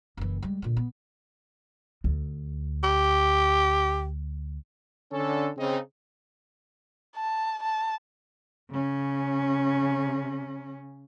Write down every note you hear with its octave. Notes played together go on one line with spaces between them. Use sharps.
F#1 E3
G3 G#3
A#2 D3
B3
D2
G4
D3 C#4 A4
C#3 C4 D#4
A5
A5
C#3 C#4